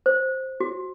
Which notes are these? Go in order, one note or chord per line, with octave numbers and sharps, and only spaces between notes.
C5
F#4